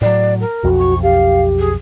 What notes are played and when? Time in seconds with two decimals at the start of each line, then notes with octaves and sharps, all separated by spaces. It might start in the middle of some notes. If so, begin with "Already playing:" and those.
0.01 A2 F#3 D5
0.41 A#4
0.63 B1 F2 F#4
0.79 C#6
1.03 G4 F5
1.59 G#4